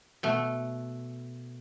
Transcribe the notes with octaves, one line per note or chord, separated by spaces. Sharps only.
B2 A3